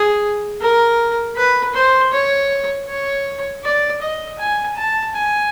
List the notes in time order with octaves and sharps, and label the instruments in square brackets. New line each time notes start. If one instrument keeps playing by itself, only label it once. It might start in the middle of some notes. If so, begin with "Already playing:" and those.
Already playing: [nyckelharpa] G#4
A#4
B4
C5
C#5
C#5
D5
D#5
G#5
A5
G#5